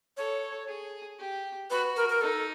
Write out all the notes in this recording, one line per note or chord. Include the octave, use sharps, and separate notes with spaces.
A4 C#5
G#4
G4
F#4 B4
A#4
A#4
D#4 A4